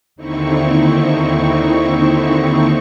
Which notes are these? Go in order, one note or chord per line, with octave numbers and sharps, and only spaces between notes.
D#2 D3 C4 D#4 E4 C#6